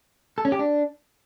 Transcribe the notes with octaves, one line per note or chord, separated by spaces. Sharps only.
A4
C#4
G4
D4